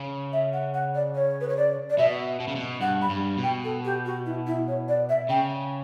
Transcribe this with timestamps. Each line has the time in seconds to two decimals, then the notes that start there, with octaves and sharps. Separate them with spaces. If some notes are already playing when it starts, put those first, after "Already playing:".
Already playing: C#3
0.33 E5
0.53 F#5
0.74 F#5
0.95 D5
1.15 C#5
1.41 B4
1.49 C#5
1.57 D5
1.90 D5
1.98 B2 E5
2.40 B2
2.48 C#3
2.56 B2
2.81 G2 F#5
3.02 B5
3.09 G2
3.37 B2
3.43 G5
3.64 A4
3.85 G4
4.06 F#4
4.26 E4
4.47 E4
4.68 C#5
4.89 D5
5.09 E5
5.30 C#3 G5